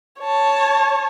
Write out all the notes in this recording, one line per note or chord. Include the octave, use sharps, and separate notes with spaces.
C#5 A5